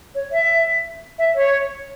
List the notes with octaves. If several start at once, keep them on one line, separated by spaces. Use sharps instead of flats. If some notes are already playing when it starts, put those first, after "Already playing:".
C#5
E5
E5
C#5